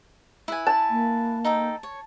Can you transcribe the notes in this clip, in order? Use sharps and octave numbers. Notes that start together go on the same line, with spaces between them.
E4 B4 G#5
A5
A#3
D#4 A4 G5
C#5